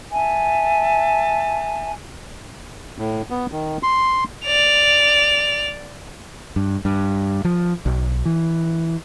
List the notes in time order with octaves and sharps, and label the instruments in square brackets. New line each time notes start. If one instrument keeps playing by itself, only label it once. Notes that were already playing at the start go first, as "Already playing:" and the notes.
[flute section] E5 G#5 A5
[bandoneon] A2
B3
D#3
C6
[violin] D5 F7
[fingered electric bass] G2
G2
F3
B1
E3